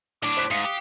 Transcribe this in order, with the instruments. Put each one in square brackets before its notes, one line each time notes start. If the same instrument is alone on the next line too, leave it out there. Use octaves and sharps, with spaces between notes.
[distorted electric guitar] A2 D4 [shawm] D6
[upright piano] C5 F#6 B6
[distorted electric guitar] G#2 [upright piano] F5 C7 C#7 [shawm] D#6
[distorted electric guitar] G4